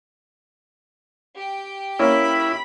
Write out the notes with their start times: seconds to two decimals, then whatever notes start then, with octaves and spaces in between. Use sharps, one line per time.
1.35 G4 G5
1.99 A#3 C#4 E4 B5